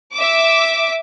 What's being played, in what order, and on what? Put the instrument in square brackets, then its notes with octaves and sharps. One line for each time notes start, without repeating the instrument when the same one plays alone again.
[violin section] E5 D6